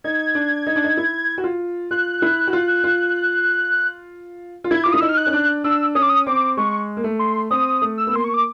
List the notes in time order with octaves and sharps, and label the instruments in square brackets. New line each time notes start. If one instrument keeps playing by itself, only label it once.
[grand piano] D#4 [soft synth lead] G#6
[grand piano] D4
D#4
D4
D#4
E4
F#4
F4
[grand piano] F4 [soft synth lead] F#6
[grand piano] E4
F#4
F4
F4
F4
[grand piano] E4 [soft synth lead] G#6
[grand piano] F4 [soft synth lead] D6
[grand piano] E4 [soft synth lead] D#6
[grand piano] D#4 [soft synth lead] E6
[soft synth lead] F6
F#6
[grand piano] C#4
D4
[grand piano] D4 [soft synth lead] E6
[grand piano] C#4 [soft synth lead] D#6
[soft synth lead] D6
D#6
[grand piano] C4 [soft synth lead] D6
[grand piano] G#3 [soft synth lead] C#6
[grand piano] A#3
A3
[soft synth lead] C6
[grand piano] C4 [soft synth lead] D#6
[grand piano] A3
[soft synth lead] E6
[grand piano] B3
[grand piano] A#3 [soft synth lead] C6
[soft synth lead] C#6
D6